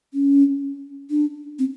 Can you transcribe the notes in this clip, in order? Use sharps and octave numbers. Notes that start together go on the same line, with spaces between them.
C#4
D4
C4